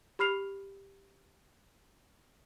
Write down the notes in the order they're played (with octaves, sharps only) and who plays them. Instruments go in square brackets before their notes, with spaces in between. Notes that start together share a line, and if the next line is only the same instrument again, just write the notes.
[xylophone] G4 B5 F6 C7 F7